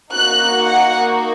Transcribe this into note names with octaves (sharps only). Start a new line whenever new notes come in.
A#3 D#4 F#4 F#6
F#5